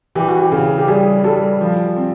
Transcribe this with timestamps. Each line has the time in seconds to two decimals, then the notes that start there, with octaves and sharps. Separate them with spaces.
0.15 E3 G4
0.28 F#4
0.39 G4
0.52 C#3
0.78 G4
0.88 G3 G#4
1.24 G3 A4
1.61 F3
1.96 C4